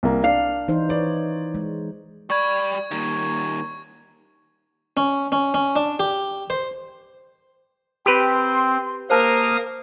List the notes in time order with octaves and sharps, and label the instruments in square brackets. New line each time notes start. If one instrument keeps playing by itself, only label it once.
[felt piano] C2 A#3
[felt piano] D4 [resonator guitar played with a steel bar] F5
[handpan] E3 D#4 C5
[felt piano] B4 D5 [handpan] C#5
[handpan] G#3
[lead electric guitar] G3 B5 [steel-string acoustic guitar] D5 [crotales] C#6 G#6
[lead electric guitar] D#3 G3 [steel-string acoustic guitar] A#3
[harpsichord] C#4
C#4
C#4
D4
G4
C5
[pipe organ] C4 [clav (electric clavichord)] G4 B4 [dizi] C6
[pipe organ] A#3 F5 D#6 [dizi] A#4 [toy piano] C5 A5 E6